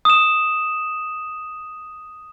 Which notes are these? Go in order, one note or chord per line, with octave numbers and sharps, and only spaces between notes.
D#6 E7